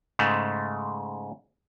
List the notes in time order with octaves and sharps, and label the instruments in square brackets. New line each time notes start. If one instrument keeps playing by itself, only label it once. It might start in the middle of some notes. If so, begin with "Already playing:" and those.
[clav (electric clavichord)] G#2 C#3 G#3 A3